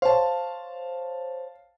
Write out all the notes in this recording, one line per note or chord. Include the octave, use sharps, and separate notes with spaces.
C5 C#5 F5 A5